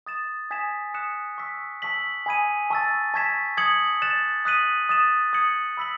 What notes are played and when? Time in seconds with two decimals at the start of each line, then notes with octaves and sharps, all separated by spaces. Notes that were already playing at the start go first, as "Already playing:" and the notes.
0.07 D#6 A6 E7
0.51 G#5 D#6 G#6 B6 E7
0.94 D#6 F#6 C#7 E7
1.38 C#6 E6 B6
1.82 A5 C#6 E6 B6 F#7
2.26 G#5 B5 D#6 G#6 D#7
2.70 A5 C#6 E6 A6
3.14 A5 C#6 G#6 B6 E7
3.57 D#6 G#6 C#7 F#7
4.02 F#6 A6 E7
4.45 D#6 F#6 B6 D#7 F#7
4.89 D#6 A6 E7
5.33 D#6 G#6 C#7 F#7
5.77 B5 E6 B6 F#7